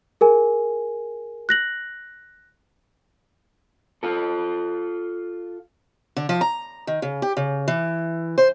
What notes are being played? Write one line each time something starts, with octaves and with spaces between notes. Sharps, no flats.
G#4 A#4 G#5
F#6 A#6 F#7
F4 A4
D3
F3
A#5
D#3
C#3
G4
C#3
E3
C5